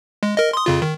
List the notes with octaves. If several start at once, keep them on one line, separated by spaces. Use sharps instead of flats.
G#3
A#4 D#5
C6 D#6
F2 C#3 F4
D#3